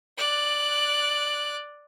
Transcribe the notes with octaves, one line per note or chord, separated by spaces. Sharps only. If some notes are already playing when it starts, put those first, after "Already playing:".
D5 F#6